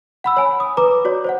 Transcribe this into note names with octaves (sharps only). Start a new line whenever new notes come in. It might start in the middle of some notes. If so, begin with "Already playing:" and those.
F#5 B5 E6
C#5 G#5 B5
D#6
B4 A#5 D6
F#4 C#5 D5
C5 D5 F#5